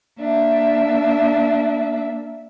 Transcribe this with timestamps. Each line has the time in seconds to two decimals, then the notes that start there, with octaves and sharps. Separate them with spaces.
0.19 A#3 D4 E5